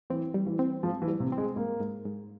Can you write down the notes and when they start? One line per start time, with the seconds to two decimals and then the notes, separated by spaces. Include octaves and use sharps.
0.10 E3 C4
0.34 G3
0.47 E3
0.59 C4
0.83 G#2 F3
1.02 E3
1.08 G3
1.20 C3
1.32 C4
1.38 G#3
1.56 G#2 A#3
1.80 G#2
2.05 G#2